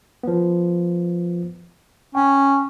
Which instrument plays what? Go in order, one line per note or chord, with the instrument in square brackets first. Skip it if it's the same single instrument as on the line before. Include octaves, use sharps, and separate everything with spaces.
[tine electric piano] F3 B3
[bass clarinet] C#4 [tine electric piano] G5